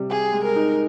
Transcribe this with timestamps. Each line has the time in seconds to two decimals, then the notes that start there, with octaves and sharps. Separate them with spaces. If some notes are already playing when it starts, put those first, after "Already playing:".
Already playing: C3 G3
0.10 G4 G#4
0.32 G#3
0.44 A#4
0.56 D#4